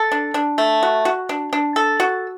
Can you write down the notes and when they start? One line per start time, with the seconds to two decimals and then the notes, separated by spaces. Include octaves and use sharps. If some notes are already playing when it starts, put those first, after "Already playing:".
Already playing: A4
0.12 D4
0.34 D4
0.58 A3
0.83 F#4
1.05 F#4
1.29 D4
1.53 D4
1.76 A4
2.00 F#4